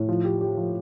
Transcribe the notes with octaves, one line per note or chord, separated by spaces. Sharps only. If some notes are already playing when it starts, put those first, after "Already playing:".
Already playing: A2
F3
G4
G4
F3